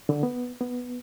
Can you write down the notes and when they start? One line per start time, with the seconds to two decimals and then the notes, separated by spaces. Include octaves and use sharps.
0.09 D3
0.23 B3
0.61 B3